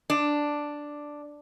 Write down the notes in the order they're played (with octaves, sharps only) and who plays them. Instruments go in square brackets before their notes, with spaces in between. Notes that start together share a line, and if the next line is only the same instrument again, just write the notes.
[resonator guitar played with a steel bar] D4